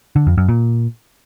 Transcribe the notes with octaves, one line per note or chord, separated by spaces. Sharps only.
D3
F2
F#2
A#2